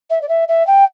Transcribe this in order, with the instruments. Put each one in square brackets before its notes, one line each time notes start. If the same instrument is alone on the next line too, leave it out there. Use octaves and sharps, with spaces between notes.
[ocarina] E5
D5
E5
E5
G5